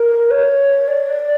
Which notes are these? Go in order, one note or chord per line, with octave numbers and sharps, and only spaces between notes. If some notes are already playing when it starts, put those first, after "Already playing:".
Already playing: A#4
C#5
D5